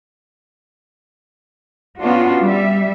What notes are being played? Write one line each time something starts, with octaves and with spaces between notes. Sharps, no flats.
B3 C#4 D4 F4 F#4
G3 E5